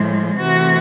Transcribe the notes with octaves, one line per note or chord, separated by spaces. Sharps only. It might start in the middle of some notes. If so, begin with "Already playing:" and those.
Already playing: A2 F3 G#3
C3 E3 A3 F#4